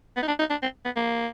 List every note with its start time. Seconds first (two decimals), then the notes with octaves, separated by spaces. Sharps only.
0.17 B3
0.23 D#4
0.28 D4
0.39 D#4
0.50 D4
0.62 C4
0.85 B3
0.96 A#3